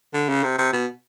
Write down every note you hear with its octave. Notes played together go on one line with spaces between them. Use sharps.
D3
C#3
C3
C3
B2